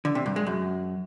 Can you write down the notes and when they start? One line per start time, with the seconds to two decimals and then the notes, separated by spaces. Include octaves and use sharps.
0.05 D3
0.15 C3
0.26 G2
0.36 G#3
0.47 F#2